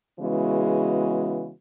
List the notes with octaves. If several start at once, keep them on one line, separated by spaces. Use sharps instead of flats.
C#3 E3 G#3 B3 F#4